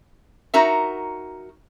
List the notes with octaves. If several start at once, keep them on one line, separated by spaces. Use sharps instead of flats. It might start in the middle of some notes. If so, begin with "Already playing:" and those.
D#4 F#4 A#4 E5